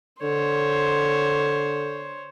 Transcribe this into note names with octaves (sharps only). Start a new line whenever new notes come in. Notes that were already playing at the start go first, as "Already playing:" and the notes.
D3 C5 C#5